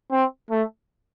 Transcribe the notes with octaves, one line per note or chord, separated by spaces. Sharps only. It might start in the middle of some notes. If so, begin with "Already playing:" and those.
C4
A3